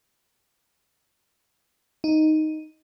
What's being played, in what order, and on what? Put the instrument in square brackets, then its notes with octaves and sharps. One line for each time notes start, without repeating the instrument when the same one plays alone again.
[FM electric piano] D#4